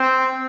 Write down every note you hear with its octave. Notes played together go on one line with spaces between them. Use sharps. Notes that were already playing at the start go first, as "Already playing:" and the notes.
Already playing: C4